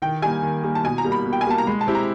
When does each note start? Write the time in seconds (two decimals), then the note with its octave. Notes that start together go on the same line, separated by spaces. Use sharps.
0.02 D#3 G5
0.22 G3 A#3 G#5
0.42 D#3
0.64 G3 A#3
0.75 A5
0.84 B2 G#5
0.98 A#5
1.04 G3 A#3
1.12 B5
1.26 B2
1.33 G5
1.41 G#5
1.47 G3 A#3 A5
1.58 A#5
1.67 G#3 B5
1.81 A5
1.87 C4 E4 G4
1.95 A#5